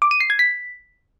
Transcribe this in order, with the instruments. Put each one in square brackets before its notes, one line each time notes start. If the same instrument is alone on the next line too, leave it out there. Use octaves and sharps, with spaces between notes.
[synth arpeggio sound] D6
D#7
C7
G#6
B6